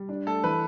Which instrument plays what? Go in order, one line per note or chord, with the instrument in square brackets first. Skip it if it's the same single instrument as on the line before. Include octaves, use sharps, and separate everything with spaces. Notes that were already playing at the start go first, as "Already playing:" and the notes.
Already playing: [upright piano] G3
D4
[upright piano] A3 [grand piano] A4
[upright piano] E3 [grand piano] B4